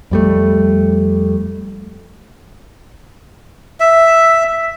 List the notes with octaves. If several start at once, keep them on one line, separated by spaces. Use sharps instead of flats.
F2 G3 A3
E5